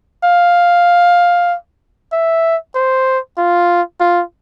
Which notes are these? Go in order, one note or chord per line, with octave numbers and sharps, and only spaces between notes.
F5
E5
C5
F4
F4